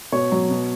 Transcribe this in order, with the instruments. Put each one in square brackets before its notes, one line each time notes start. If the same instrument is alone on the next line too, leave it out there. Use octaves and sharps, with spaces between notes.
[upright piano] B2 C#5
F#3
B2